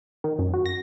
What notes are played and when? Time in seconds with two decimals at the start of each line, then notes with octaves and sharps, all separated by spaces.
0.24 D#3
0.39 F#2
0.54 F#4
0.66 A#6